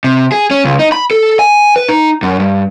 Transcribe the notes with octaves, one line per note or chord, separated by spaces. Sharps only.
C3
G#4
C#4
C#2
D#4
B5
A4
G#5
B4
D#4
F#2
G2